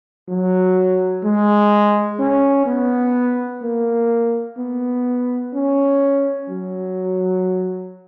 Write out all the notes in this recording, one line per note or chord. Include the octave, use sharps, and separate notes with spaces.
F#3
G#3
C#4
B3
A#3
B3
C#4
F#3